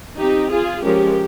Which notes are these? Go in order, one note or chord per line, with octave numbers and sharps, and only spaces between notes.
F3 C4 D#4 G4
F4 G#4
F3 G#3 C#4 G4 A#4